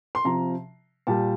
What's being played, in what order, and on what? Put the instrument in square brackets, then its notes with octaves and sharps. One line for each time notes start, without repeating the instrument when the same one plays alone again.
[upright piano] C6
C3 F3 A#5
A#2 G3 A5